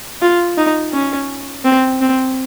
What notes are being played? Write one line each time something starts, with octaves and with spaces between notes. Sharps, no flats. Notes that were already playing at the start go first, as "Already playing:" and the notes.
F4
D#4
C#4
C4
C4